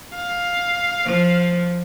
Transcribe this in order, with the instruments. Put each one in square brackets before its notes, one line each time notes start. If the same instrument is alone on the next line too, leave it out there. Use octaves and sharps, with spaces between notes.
[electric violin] F5
[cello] F3